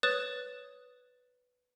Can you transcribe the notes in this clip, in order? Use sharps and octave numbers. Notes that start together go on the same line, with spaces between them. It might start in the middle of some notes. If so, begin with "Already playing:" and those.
B4 C#5 D#6 F#6 A6 E7